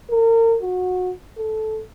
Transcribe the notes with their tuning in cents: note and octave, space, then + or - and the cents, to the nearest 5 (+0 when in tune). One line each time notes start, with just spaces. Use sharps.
A#4 -35
F#4 -20
A4 -10